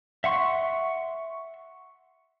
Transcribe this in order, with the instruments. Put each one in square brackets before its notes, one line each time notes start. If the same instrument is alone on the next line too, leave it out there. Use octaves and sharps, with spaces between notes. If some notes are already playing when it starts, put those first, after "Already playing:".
[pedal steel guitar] E5 F#5 C6 C#6